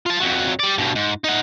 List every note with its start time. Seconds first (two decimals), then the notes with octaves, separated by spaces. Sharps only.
0.06 F4 A5
0.21 F2 F#3
0.60 G3 D5
0.78 G2 B2
0.96 G#2
1.24 D#4 F#5